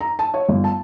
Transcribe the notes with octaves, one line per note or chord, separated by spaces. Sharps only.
A#5
A5
C#5
G1
A5